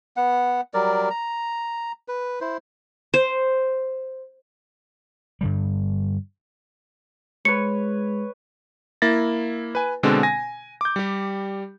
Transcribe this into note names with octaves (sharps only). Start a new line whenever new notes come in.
B3 F#5
F#3 G3 A#4 D5
A#5
B4
E4 C5
C5
G2 D3 G3
G#3 B4 C#5 C#7
A#3 E4 A6 A#6
B4 G#5
B2 D3 G#3 C4 D4
G#5 A#6
D6 G6
G3 G4